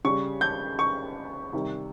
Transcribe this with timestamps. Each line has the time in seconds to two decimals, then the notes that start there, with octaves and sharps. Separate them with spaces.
0.05 C#3 G3 C#6
0.41 G6
0.79 C#6
1.53 C3 D#3 G3